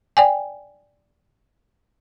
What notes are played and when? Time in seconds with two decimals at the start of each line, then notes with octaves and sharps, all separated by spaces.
0.17 D5 G5 G#5